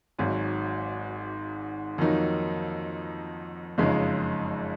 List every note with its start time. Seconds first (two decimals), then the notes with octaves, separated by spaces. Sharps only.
0.18 G#1 G#2 F#3
1.98 F2 D#3 F#3 A#3 D#4
3.78 F#1 F2 C#3 G#3 D#4